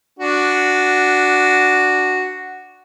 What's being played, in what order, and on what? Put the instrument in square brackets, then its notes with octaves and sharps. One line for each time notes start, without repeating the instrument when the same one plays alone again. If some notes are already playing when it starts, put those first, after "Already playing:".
[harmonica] D4 F#4